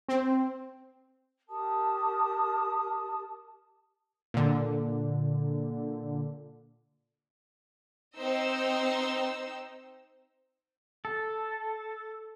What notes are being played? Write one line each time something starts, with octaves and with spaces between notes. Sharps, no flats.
C4
G4 A#4 A5 D#6
A#2 D3
C4 D#4 C5 D#5 E6
A4